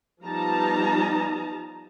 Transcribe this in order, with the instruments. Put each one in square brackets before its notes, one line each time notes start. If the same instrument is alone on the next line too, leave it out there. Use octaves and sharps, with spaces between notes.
[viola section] F3 G3 B3 D#4 A5 A#5